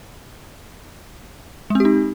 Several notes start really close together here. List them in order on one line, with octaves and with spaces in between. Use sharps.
G#3 C4 G4 D#4